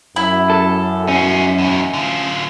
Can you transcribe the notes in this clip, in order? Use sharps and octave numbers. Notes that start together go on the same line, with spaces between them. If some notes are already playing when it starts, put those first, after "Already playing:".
F#2 E4
A4
C#4 D#4 F#4
E2 D#4
D3 F4